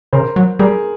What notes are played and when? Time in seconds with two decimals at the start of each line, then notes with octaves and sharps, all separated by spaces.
0.13 C#3 A#4 C5
0.36 F#3
0.59 G3 G#4 A#4